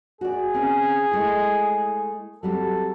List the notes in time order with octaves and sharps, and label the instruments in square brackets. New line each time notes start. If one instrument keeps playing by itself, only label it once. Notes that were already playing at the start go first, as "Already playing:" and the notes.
[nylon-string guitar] F#4 C#5 D5 [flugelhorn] G#4
[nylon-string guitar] C4 C#4 B4
G#3 A3 E4
[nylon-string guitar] F#3 G3 C4 [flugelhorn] A4